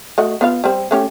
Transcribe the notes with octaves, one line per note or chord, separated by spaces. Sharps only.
A3 F#4 D#5
B3 F4 F5
G3 C4
A3 C#4 G4